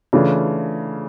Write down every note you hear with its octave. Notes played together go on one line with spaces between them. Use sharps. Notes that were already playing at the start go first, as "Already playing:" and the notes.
C#3 E3 A3 D4 F4